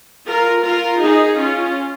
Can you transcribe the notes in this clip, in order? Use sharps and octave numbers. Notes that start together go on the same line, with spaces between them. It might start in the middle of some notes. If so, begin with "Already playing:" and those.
F4 A#4
F4 A#4
D#4 G#4
C#4 F4